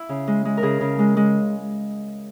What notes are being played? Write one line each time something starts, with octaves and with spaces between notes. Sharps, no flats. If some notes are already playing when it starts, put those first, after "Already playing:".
Already playing: E4
C#3
G#3
G#3
A#4
C#3 G#4
C#3
G#3
G#3